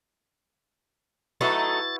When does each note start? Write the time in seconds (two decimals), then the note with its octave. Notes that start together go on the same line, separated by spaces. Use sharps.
1.41 F#3 A3 D#4 E4 F#4 B4 A6